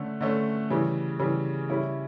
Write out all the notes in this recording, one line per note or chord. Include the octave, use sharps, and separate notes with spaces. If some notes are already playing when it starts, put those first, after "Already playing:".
Already playing: D3 A3 C#4
D3 A3 C#4
C#3 E3 G3
C#3 E3 G3
C#3 G3 C#4 E4